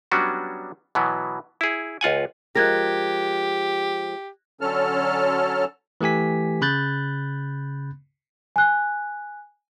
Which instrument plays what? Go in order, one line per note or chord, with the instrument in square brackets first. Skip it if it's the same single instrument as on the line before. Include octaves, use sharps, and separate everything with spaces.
[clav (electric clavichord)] F#3 G3 B3 C#4 D4 F#4
B2 E3 F#3 B3
E4 G#4
C#2 F4 F#5 G#5
[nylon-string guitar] F3 G#3 A#4 [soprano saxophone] G4 [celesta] F#6 G#6 A#6
[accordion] D3 F#3 C#4 A4 A5 F6
[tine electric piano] E3 A3 G4 G#5 B6
C#3 B5 F#6 G6 A6
[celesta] G#5 F#6